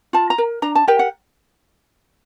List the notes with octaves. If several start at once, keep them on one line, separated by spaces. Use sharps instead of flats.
F4 A5
A#5
A#4
D4 A#5
A5
G4 A#4 G5
F#5